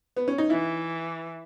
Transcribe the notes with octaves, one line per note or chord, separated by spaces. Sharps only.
B3
C#4
D#4
E3 E4